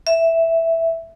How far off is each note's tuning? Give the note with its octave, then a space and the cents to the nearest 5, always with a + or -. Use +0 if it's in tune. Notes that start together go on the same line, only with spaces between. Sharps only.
E5 +0